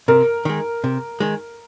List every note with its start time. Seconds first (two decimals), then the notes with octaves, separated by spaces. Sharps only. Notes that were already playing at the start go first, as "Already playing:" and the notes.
0.08 C3 A#4
0.45 D#3 G#3
0.84 C3
1.20 D#3 G#3